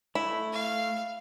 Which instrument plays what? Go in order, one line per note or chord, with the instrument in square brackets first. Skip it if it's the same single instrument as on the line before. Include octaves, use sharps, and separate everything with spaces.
[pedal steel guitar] A3 [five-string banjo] E4
[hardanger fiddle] F5